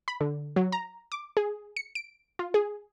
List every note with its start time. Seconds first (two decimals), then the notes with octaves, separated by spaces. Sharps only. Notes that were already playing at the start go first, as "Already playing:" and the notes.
0.08 B5
0.21 D3
0.56 F#3
0.72 A#5
1.12 D6
1.37 G#4
1.77 C#7
1.95 D7
2.39 F4
2.54 G#4